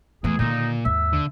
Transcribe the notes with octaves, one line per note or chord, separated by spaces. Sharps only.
E2 E3 A3 G#4
A#2 D3 D#3 D#4
D#2 G#2 E5
D3